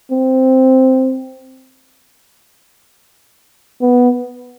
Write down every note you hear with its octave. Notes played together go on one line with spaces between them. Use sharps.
C4
B3